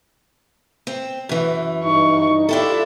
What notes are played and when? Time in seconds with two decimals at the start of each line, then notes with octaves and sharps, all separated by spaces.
0.87 C4
1.29 F#2 E3
1.84 G2 D#4 C#6
2.49 D4 E4 F4 G4 A4 E5